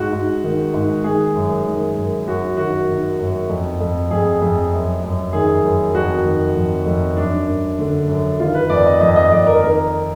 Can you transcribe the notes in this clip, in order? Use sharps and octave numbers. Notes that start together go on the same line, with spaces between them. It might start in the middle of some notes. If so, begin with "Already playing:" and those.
Already playing: G#2 F#4
G#2
D#3
G#2
D#3 G#4
F#2
D#3
F#2
F#2 F#4
D#3 F#4
D#3
F#2
F2
F2
F2 G#4
F2
F#2
F#2
D#3 G#4
F#2
F2 F#4
D#3
F2
F2
F#2 D4
F#2
D3
F#2
D#3 F4
B4
F2 D5
D#5
F2 D#5
D#5
F2 D5
A#4
D#3 A#4